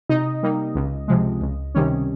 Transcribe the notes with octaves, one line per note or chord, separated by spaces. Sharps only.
C3 D#4 D#5
G3 A#3 D#4
C#2
C3 F3 G#3
C#2
C3 D#3 G3 C#4